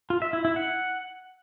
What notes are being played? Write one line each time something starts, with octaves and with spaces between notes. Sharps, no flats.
F4
E5
E4
E4
F#5